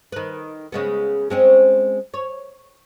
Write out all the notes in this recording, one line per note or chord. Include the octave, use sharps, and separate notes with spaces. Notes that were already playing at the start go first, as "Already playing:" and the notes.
D#3 B4
C#3 G#3 B3
G#3 C4 C#4
C#5